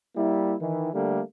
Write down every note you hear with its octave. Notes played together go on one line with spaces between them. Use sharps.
G3 A#3 E4
D#3 E3
D3 G3 A3 A#3 D4